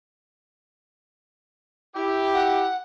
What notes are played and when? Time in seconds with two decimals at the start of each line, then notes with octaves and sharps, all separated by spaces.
1.95 E4 G4
2.34 F#5